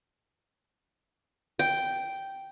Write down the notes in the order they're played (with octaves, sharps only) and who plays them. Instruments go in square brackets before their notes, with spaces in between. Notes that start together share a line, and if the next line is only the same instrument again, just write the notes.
[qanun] G5